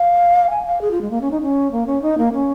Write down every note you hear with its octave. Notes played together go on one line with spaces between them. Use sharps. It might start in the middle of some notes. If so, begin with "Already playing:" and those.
Already playing: F5
G#5
F5
G#4
F4
G#3
A#3
C#4
D#4
C#4
A#3
C#4
D#4
A#3
C#4